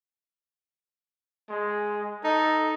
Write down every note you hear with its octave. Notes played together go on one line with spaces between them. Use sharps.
G#3
D#4 A4